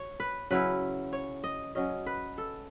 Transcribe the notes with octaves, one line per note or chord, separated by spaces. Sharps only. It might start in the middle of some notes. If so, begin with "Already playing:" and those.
Already playing: C#5
B4
C#3 F#3 C#4 E4 B4
C#5
D#5
C#3 F#3 C#4 D#5
B4
A4